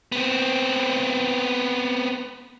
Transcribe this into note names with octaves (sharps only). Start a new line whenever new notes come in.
B3 C4